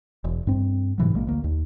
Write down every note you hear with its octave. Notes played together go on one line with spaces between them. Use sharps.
E1
G2 C4
G#2 C3 E3 F#3
A#1 G#3 A#3
D2 A#3
D#2